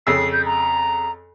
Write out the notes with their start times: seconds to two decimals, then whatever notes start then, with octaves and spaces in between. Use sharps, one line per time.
0.07 F2 C#3 E6 C7
0.32 G6
0.46 A#5